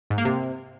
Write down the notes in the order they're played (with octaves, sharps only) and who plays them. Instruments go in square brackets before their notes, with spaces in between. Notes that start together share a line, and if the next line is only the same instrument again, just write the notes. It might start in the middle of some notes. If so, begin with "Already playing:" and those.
[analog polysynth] G#2
A#3
C3